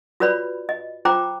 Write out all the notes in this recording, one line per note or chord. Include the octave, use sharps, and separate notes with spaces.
F4 F#4 B4 C#5 D5 B5
D#5
F4 C5 G5 A#5 D6